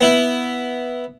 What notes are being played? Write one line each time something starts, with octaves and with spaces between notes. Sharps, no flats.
B3 E4